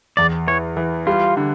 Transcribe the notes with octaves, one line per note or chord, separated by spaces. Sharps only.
E2 D5
E3 C#5
E3
G3 F4
D3